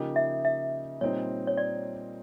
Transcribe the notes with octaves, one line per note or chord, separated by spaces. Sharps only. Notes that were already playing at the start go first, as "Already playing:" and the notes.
Already playing: C#3 F3 A#3 D#4 G4
E5
E5
A#2 G3 C4 D#4 C#5
C#5
D5